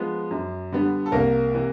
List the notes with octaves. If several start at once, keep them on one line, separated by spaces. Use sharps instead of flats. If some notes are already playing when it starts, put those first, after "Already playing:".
Already playing: F3 G#3 B3
F#2
D3 G3 B3
A4
C2 A#3 A#4
C3 E3